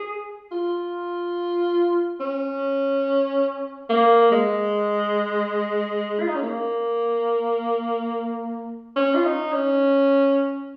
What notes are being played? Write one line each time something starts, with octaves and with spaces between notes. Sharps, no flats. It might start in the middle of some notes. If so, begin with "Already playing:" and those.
Already playing: G#4
F4
C#4
A#3
G#3
F4
D#4
C#4
A#3
C#4
F4
D#4
C#4